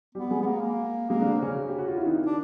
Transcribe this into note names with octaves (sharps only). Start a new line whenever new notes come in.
G3 B3 G4
G#3 G#4
B3
A#3
A#3
G#3 A#3 G#4
D3 D4
C4
C#3 C#4
G4
F#4
F4
E4
D#3 D#4
D4